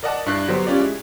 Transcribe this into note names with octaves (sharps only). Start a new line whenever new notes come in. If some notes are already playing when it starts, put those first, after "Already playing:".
A#4 D5 D#5 F#5 A5
G2 D4 E4 F#6 C7
D3 F#3 B3 G4 C5
C#4 F4 G4 D5
G#3 E4